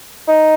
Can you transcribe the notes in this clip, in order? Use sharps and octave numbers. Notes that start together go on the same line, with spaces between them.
D#4